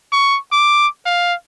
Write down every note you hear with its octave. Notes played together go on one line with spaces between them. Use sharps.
C#6
D6
F5